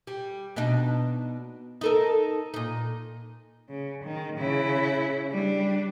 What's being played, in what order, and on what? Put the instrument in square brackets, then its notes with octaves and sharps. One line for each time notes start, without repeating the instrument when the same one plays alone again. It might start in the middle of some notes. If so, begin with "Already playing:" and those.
[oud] G3
B2 D4 D#4
D#4 A4 A#4
A#2 D#4
[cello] C#3
D#3
C#3 E4
G3 D4